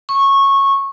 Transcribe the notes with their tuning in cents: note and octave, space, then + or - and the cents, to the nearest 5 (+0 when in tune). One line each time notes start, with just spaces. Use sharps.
C#6 -15